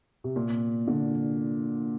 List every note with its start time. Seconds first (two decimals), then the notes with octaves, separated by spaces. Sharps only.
0.24 C3
0.36 A#2
0.88 D3